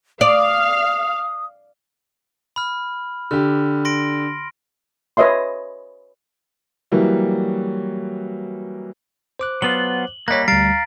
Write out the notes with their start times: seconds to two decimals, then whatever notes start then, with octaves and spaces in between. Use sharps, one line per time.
0.21 D5 F5 D#6
2.56 B5 F6
3.31 D3 G4 F6
3.85 C6 A#6 D7
5.17 B4 C#5 D#5 E5 C6
6.92 E3 F#3 G3 A#3
9.39 C5 D6 F#6
9.62 F#3 B3 F4 F#7 G7
10.28 G3 A#3 C#5 D#5 F#6 A#6 B6
10.48 D2 G3 F5 A#5 A6 D7